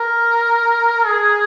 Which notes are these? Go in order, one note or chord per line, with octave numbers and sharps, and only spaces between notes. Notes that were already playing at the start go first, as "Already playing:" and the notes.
Already playing: A#4
G#4